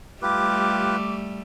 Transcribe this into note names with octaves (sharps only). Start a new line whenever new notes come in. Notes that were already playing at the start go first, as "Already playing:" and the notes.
G3 A3 F4 G4 B4 D6